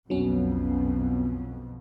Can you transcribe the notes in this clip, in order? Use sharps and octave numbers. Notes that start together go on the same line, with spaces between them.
B1 F2 B2 F#3 B3 C#4